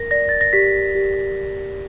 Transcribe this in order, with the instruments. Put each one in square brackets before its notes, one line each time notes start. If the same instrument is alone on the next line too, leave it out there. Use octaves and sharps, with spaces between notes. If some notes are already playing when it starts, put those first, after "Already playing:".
Already playing: [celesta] A#4 A#6
D5 A#6
A6
A#6
G4 B6
G4